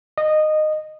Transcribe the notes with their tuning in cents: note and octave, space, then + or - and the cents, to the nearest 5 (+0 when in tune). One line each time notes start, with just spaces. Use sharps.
D#5 -15